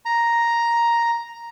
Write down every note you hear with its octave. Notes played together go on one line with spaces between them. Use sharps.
A#5